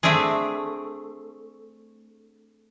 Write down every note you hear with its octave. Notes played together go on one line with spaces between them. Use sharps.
A3 C4 D4 G#4